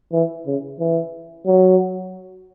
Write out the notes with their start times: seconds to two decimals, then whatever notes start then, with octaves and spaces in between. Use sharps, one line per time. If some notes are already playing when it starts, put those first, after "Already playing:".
0.13 E3
0.47 C#3
0.79 E3
1.46 F#3